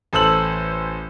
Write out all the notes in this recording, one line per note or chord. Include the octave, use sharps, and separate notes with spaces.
A1 A4 C5 E6 F#7